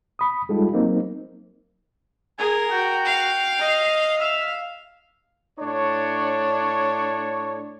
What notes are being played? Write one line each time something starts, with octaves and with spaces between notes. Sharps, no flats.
B5 D#6
G3 G#3 D#4 F4 G4 A4
F#3 A#3 C4 D#4
G#4 A#4 G#5
F#4 G5
F5
D#5
E5 F5
A2 D4 C#5